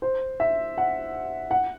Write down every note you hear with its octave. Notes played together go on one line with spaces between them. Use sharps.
C5
E5
F#5
F#5